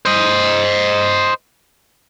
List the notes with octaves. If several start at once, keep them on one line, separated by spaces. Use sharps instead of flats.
C5 D#5